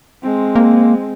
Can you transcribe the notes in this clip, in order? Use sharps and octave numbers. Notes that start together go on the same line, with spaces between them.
G#3 C4
A#3